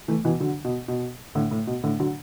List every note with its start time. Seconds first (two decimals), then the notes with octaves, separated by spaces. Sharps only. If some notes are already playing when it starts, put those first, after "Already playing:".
0.08 E3 A3
0.24 B2 E3
0.40 D3 F#3
0.65 B2
0.88 B2
1.35 A2 D3
1.51 A2
1.67 B2
1.83 A2 D3
2.00 D3 F#3